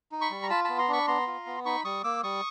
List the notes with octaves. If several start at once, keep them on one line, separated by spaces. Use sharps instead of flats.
D#4
B5 C#6
G3
A#5
F4 A5 B5
B3 A5 B5
A#5 C6
D4 B5 C#6
B3 A#5 C6
F4
B3
D#4 B5 C#6
G3 C#6 D#6
A#3 D6 E6
G3 C#6 D#6